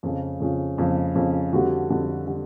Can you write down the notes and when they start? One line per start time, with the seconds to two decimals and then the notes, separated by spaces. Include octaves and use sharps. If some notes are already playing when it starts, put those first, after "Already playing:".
0.03 F2 C#3 F3 F4
0.40 F2 C#3 F3
0.78 F2 C#3 F3
1.15 F2 C#3 F3
1.53 F2 D3 G3 F#4
1.90 F2 D3 G3
2.27 D3 G3